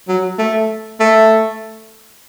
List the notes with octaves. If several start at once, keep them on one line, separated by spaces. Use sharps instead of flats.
F#3
A3
A3